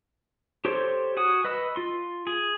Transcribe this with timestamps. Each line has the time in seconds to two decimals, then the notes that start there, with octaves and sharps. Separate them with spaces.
0.65 G4 A4 C5 C#5 C6
1.17 F#4 G#5 D#6
1.44 B4 D#5 B5 E6
1.76 F4 C6
2.27 G#4